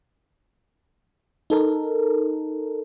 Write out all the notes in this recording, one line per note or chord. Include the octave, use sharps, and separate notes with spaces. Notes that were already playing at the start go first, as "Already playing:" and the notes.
D#4 A4 A#4